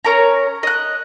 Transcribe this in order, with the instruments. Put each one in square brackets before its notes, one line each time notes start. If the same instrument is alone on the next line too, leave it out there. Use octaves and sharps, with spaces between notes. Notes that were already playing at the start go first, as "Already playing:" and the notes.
[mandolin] C#4 A#4 C#5 A#5
D#5 F#6